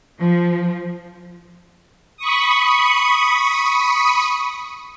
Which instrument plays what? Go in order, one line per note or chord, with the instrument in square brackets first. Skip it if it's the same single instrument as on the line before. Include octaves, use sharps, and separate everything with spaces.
[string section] F3
[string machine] B5 C#6 D#6